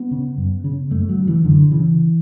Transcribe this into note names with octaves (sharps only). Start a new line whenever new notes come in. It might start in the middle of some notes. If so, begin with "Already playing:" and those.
Already playing: B3
C#3
F#2
C#3
F#2 A3
F#3
C#3
E3
F#2 D3
C#3 E3